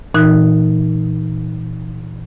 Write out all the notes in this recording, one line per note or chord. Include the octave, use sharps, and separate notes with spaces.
A#2 E3 D#4 F#6